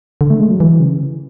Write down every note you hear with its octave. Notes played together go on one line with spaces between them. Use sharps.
D3
A3
G#3
F#3
E3
C#3